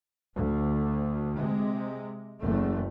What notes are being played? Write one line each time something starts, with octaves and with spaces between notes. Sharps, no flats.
D2
C3 G#3
F#1 E2 A3